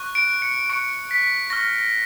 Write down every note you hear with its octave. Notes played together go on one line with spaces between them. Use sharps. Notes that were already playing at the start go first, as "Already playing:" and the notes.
Already playing: C#6 F#6
D7
C#7
C#6 F#6 D7
B6
C#6 F6 A#6